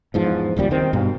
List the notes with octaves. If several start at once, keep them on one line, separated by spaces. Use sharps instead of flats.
E2 G#2 F3
D#1 C#2 A#2 G3
D#3 C4
G2 B2